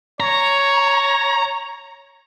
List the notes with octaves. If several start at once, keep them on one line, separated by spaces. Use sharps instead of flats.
C#5 A#5